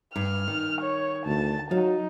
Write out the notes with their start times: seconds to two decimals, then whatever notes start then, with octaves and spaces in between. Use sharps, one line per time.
0.16 G2 F6
0.48 D#3
0.81 C#5
1.26 D2 A5
1.71 F#3 D#4 F5